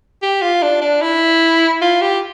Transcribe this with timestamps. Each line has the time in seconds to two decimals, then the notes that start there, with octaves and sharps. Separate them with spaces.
0.22 G4
0.42 F4
0.63 D4
0.82 D4
1.02 E4
1.82 F4
2.01 G4